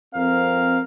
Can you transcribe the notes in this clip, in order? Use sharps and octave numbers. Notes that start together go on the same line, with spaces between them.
F2 C4 A#4 F5